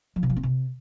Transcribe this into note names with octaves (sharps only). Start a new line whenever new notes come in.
F3
C3
F3
C4
C3